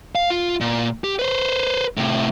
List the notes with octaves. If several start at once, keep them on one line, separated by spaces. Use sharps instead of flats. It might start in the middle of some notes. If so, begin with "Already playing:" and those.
F5
F4
A#2
G4
B4 C5
A2 C3